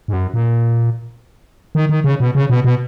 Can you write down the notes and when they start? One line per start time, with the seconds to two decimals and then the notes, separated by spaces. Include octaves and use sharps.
0.08 G#2
0.13 F#2
0.34 A#2
1.75 D#3
1.89 D#3
2.04 C#3
2.20 B2
2.35 C#3
2.50 B2
2.64 B2